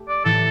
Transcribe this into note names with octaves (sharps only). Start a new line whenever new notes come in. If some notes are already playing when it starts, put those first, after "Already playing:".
Already playing: A3 G4
D5
A2 E3 A3 A4